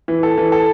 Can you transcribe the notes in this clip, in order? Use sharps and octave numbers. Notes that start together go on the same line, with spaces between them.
E3
A4
E3
A4